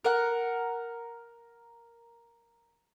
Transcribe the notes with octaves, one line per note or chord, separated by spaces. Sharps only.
A#4 F#5